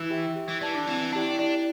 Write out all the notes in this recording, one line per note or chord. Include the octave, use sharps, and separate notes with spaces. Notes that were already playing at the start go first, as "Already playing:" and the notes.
Already playing: E3
G4 E5 G5
G4
E3
E3 D5 A5
D3
E3 C4
D4 E4 G4 D5 G5
D4 E4